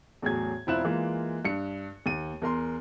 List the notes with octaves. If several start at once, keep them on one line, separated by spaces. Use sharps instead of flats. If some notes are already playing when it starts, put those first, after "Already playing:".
E2 A2 F#3 G#4 G#6
E1 C4 E4 F4 F#6 E7
E3 G#3 A#3 F4
G2 C#7
D#2 D#7
E2 A#4 C6